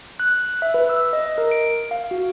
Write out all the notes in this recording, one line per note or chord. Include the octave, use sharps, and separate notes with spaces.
F#6
E5
B4
E6
D#5
A#4
D7
F5
F#4